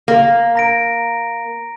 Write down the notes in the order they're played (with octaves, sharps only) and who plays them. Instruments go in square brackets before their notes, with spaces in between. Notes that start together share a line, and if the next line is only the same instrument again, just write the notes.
[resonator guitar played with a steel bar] A#3
[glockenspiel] A#5 A#6 D7